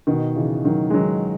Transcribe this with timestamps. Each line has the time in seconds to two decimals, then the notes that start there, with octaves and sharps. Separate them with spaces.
0.07 B2 D#3
0.36 C#3 E3
0.65 D#3 F#3
0.90 G#3
0.94 D#3 F#3